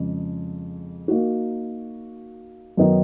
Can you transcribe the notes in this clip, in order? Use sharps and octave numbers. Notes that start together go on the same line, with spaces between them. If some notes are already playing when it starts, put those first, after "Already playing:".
Already playing: F2 C#3 G#3
A#3 D#4 F#4
F#2 D#3 F#3 B3 D#4